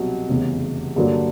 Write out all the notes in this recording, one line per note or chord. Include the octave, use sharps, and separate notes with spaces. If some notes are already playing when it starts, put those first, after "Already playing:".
Already playing: C2 B2 F#3
F1 E2 C#3
G2 D3 F#3 A#3 D4